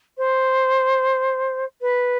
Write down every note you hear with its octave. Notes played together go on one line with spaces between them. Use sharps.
C5
B4